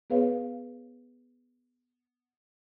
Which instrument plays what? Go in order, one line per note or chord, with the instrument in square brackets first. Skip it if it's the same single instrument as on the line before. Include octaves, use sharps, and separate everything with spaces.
[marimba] B3 G#4 B4 C#5 F5